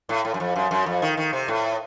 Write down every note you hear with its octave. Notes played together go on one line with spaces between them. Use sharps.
A2
A2
F#2
F2
F#2
F#2
F2
D#3
D#3
C3
A2